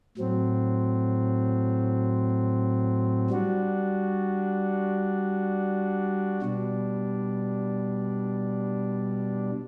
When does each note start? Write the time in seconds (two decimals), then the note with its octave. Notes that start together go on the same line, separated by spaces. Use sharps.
0.18 A2 F#3 C4
3.30 G3 D4 F#4
6.42 B2 G3 D4